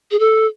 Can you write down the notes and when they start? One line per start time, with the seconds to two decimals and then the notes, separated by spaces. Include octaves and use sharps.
0.11 G#4
0.19 A4